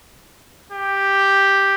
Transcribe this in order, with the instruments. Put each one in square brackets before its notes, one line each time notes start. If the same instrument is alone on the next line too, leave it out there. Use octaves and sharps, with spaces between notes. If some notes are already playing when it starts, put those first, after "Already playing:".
[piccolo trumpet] G4